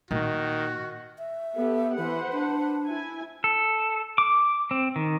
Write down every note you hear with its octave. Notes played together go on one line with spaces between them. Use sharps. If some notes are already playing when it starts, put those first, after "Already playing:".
A#2 D#3 F#4
E5
B3 G4 A4
E3 B4 C5 F#5
D4
E4 G#5
A4
D6
C4
D#3